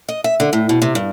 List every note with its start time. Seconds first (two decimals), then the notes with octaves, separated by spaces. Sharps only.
0.08 D#5
0.24 E5
0.40 D3
0.53 A2
0.69 B2
0.82 C3
0.95 G2